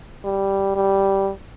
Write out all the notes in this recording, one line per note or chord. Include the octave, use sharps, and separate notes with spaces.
G3
G3